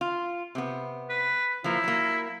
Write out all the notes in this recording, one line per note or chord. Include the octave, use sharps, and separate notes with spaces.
F4
C3 B3
B4
F3 A#3 E4
F#3 A#3